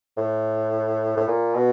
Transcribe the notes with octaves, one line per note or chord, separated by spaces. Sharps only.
A2
A2
A#2
B2